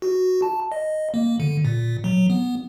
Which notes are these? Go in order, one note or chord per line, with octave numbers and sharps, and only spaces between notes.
F#4
A5
D#5
A#3
D3
A#2
F#3
B3